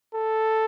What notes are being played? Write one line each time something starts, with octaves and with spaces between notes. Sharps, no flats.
A4